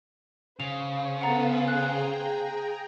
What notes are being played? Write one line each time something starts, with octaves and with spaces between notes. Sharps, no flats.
C#3 C5 F5 F7
B3 A4 B4 F#5 A#5 A6
G#4 G5 A#5 F#6